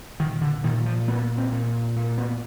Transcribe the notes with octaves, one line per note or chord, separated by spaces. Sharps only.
A#2 D#3
D3
A#2 D#3
F3
A#2 B3
C4
A#2
A#2
B3